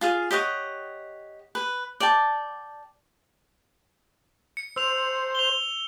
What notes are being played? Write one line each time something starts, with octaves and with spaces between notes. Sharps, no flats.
F4 G#4 F5
G4 C#5 D#5 F#5
B4
D5 G5 A5
C#7
C5 E6 F7
F7 G7